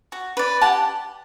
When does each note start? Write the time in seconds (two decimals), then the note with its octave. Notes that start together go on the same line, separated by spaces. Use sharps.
0.12 F#4
0.37 B4 D5
0.61 G4 F#5 A5